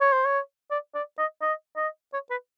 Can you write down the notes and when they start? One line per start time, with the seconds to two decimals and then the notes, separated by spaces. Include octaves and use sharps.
0.01 C#5
0.13 C5
0.25 C#5
0.71 D5
0.95 D5
1.18 D#5
1.42 D#5
1.77 D#5
2.13 C#5
2.30 B4